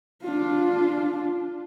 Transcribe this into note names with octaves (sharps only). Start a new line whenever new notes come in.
D4 F4